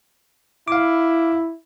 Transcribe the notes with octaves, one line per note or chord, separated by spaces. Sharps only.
E4 F5 D6